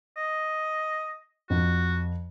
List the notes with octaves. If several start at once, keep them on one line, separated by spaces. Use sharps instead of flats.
D#5
F2 F#4